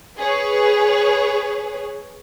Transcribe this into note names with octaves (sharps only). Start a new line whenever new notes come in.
G#4 B4 C#5